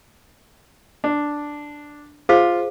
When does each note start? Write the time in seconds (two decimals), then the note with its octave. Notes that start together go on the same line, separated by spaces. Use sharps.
1.04 D4
2.29 F4 G#4 C5 F5